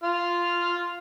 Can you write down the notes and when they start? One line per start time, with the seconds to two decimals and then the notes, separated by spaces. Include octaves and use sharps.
0.03 F4 F6